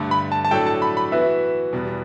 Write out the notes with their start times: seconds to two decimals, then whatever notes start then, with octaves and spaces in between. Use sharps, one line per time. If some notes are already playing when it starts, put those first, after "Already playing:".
Already playing: G2 D3 A3
0.11 B5
0.32 A5
0.45 A5
0.51 A2 F#3 A3 D4 A4 G5
0.67 A5
0.82 B5
0.97 B5
1.12 E3 B3 F#4 B4 E5
1.73 E2 B2 G3 B3